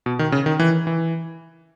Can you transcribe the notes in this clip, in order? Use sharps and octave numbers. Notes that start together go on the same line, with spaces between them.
B2
D#3
C#3
D#3
E3
E3